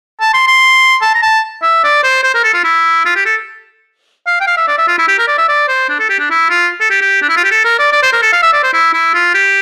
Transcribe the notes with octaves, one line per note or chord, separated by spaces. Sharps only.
A5
C6
C6
A5
A#5
A5
E5
D5
C5
C5
A#4
A4
F4
E4
F4
G4
A4
F5
G5
F5
E5
D5
E5
F4
E4
G4
A#4
D5
E5
D5
C5
D4
A4
G4
D4
E4
F4
A4
G4
G4
D4
E4
F4
G4
A4
A#4
D5
D5
C5
A#4
A4
F5
E5
D5
C5
E4
E4
F4
G4